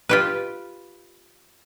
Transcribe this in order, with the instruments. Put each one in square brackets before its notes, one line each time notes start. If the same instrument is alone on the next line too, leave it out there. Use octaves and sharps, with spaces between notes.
[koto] F4 G4 B4